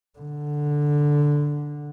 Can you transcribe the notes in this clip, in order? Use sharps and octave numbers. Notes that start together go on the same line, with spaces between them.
D3